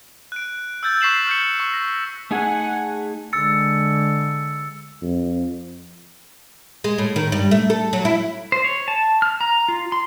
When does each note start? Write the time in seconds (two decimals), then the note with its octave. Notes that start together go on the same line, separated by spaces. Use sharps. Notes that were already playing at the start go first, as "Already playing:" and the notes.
0.32 F#6 D7
0.83 E6 F#6 G6 A6
1.01 C#6 B6 C7 E7 F#7
1.27 F6 G6 C#7
1.60 C#6
1.73 A#6
2.31 A3 D#4 G#4 F#5 G#5
3.33 D3 G#3 E6 A6 C#7
5.02 F2
6.84 G#3
6.98 A2
7.16 D#3
7.32 G2
7.51 A3
7.70 A4
7.93 F#3
8.05 E4
8.52 C5
8.64 C#5
8.88 A5
9.22 F6
9.41 A#5
9.69 F4
9.92 C6